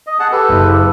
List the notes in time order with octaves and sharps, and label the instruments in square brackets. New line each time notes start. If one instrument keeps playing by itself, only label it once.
[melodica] D#5
G#4 F#5 A5
G4 A4 B4
[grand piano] F#1